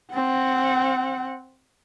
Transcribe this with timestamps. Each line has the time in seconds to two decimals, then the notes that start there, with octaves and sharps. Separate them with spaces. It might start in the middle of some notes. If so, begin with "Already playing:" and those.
0.13 C4 F#5